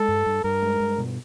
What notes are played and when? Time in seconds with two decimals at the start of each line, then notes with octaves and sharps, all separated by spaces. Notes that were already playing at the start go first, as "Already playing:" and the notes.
Already playing: G#3 A4
0.08 G2
0.26 G2
0.44 G2 A#4
0.62 G#3
0.80 G2
0.98 B2